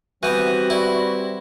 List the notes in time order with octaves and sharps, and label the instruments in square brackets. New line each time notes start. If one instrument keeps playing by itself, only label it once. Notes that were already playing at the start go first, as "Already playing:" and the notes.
[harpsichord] E3 B3 [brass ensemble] G3 C4 [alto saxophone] F#4 [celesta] F#6 G6 D#7
[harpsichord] E4 [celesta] B4 D5 B5